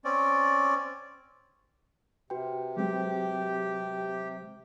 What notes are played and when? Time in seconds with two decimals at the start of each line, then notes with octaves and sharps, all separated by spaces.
0.05 C4 C#4 D5
2.30 C3 F#4 B4 G5
2.77 F#3 G#3 C4 G4